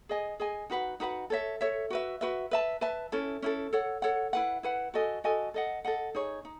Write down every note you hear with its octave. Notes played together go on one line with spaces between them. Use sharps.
G#4 D#5 G#5
G#4 D#5 G#5
D#4 F#4 B4 F#5
D#4 F#4 B4 F#5
A4 C#5 E5
A4 C#5 E5
F#4 B4 E5
F#4 B4 E5
B4 E5 A5
B4 E5 A5
C#4 E4 A4
C#4 E4 A4
A4 C#5 F#5
A4 C#5 F#5
E4 B4 F#5
E4 B4 F#5
F#4 A4 D#5 G#5
F#4 A4 D#5 G#5
A4 D#5 F#5
A4 D#5 F#5
D#4 G#4 C#5
D#4